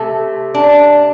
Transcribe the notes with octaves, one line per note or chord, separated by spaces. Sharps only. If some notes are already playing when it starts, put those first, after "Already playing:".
Already playing: C3 A3 A4
D4